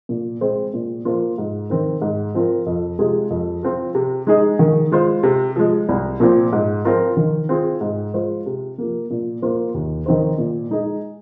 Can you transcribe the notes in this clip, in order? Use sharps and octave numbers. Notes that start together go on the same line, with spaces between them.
A#2
G#3 C4 G#4 C5
A#2
F3 A#3 F4 C5
G#2
D#3 C4 D#4 A#4
G#2
F3 C4 F4 A#4
F2
C3 G#3 F4 G#4
F2
F3 C4 F4
C3
G#3 D#4 G#4
D#3
G#3 F4 C5
C3
F3 G#3
C2
A#2 F3 C4
G#2
F3 C4 F4 A#4
D#3
C4 F4 G#4
G#2
G#3 F4 C5
C3
F3 A#3
A#2
A#3 F4 C5
D#2
D#3 C4 D#4 C5
A#2
G#3 D#4 G#4